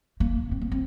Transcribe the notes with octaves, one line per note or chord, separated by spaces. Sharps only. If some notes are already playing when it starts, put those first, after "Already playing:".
A#3
C4
A#3
C4